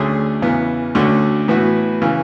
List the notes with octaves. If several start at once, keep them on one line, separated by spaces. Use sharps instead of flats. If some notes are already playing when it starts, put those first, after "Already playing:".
Already playing: D2 D3 A3 C#4 G#4
E2 C#3 E3 B3
D2 D3 A3 C#4 F#4
A2 E3 B3 F#4 B4
C#3 E3